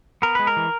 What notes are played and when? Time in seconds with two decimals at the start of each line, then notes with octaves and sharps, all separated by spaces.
0.22 B3 A#4
0.35 G#3 B4
0.47 A#4
0.57 E3